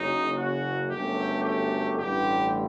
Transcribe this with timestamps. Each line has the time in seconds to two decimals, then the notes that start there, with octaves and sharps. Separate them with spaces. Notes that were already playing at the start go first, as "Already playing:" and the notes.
Already playing: F#1 F#2 F#3 D#4
0.35 F#4
0.89 G1 F#2 F#3 A3 G4
1.43 G4
1.97 A1 G2 D3 G4